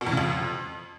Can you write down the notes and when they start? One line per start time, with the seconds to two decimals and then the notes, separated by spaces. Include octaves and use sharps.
0.01 B2
0.07 E2
0.12 C#3
0.17 F2